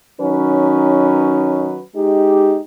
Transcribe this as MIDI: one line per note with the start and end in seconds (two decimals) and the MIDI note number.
0.20 1.80 51
0.20 1.80 54
0.20 1.80 61
0.20 1.80 63
0.20 1.80 71
1.96 2.59 56
1.96 2.59 63
1.96 2.59 67